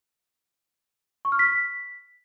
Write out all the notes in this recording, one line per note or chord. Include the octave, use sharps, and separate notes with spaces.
C#6
F6
B6